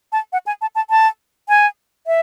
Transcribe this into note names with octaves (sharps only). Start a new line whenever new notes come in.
A5
F#5
G#5
A5
A5
A5
G#5
E5